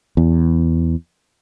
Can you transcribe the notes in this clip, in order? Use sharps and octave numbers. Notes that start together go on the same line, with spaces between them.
E2